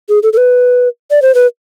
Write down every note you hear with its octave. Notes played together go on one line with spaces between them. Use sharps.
G#4
A4
A4
B4
D5
C5
B4